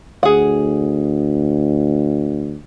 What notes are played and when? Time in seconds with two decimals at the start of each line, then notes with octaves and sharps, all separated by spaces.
0.23 D2 G#4 F#5